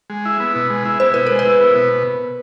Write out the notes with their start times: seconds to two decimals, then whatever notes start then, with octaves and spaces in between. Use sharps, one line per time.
0.10 G#3
0.25 E4
0.40 B3
0.56 B2
0.70 G#3
0.85 E4
1.00 B3 C5
1.14 B2 B4
1.27 G#3 A#4
1.39 B4
1.46 E4
1.61 B3
1.75 B2